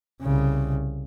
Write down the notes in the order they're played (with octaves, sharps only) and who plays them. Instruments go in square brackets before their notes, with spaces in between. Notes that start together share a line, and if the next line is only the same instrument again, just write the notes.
[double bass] C2 C#3